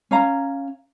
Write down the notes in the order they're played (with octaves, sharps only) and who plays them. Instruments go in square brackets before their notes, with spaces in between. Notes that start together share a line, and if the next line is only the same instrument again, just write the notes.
[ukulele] C#4 F5 A#5